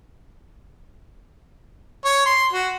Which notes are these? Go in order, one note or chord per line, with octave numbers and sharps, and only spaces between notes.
C#5
C6
F#4